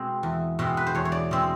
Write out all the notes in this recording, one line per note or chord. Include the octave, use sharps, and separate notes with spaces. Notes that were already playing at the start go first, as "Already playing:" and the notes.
Already playing: B2 G#3 C4
E2
B2 G#3 C4
B4
C5
E2 C#5
C#5
D5
B2 G#3 C4